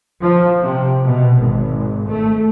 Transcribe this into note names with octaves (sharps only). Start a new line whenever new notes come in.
F3
C3
B2
G#1
A3